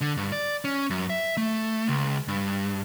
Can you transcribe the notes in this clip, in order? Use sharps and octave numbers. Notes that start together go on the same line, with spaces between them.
D3
G2
D5
C#4
F#2
E5
A3
C#2
G2